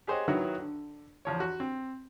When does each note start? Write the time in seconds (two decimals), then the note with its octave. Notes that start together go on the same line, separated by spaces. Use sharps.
0.07 G4 G#4 C5 C#5 D#5 F#5
0.28 D#3 F#3 B3 E4 F#4
0.59 D3
1.25 E2 F3 C#5
1.40 F#4
1.60 C4